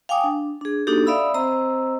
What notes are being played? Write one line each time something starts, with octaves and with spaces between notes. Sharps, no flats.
F5 G5 G#5 D6 D#6
D4
D4 G#4
A#3 D4 D#4 F#4 G4 A4
D5 E5 F5 B5 D#6 E6
C4 C5 D#5 A#5 E6